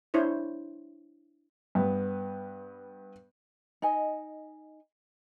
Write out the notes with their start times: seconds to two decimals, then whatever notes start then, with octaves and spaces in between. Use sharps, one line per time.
0.14 D4 E4 C5 C#5
1.75 G2 B3
3.82 D#4 D#5 G#5